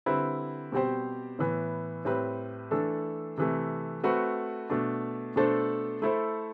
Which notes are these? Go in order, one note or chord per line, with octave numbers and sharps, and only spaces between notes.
D3 G3 C4 E4 B4
B2 G3 C4 G4 C5
A2 E3 B3
A2 G3 C4 G4 B4
E3 A3 D4 A4
C3 E3 A3
A3 C4 F#4 B4
B2 A3 D4
B2 A3 D4 A4 C5
A3 E4 A4 C5